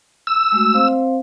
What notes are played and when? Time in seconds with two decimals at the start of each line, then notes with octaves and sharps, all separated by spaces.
0.27 E6
0.52 G#3 A3 F#4
0.74 C4 C5 F5